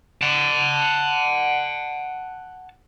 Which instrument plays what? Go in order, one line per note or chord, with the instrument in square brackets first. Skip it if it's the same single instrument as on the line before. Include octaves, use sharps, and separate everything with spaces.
[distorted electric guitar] F#5 A5